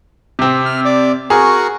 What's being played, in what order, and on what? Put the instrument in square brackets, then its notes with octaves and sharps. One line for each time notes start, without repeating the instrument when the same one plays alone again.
[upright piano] C3 C4
[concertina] F6
D5
[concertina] F#4 A#4 C#6 [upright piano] G#4